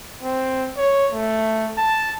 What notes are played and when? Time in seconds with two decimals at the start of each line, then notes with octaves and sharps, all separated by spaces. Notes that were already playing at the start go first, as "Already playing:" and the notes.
0.22 C4
0.77 C#5
1.12 A3
1.78 A5